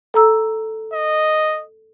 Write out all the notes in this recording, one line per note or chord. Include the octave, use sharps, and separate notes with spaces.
A4 A#5 E6
D#5